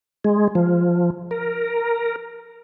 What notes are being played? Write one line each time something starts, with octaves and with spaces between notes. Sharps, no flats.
G#3
F3
A#4